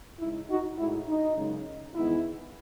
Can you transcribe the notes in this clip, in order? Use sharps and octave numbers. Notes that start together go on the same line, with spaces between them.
C#3 G#3 D#4 E4
D#4 F#4
A2 G#3 D#4 E4
D#4
F#2 C#3 G#3
E2 D#3 G#3 B3 D#4 E4